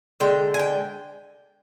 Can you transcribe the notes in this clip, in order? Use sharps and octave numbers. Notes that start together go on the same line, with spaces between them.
D3 G#3 G5
G#5
G5